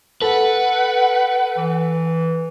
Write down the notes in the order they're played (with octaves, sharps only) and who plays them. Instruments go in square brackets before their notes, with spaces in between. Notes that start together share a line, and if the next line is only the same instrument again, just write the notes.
[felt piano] A4 [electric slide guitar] B4 [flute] F#5
[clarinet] E3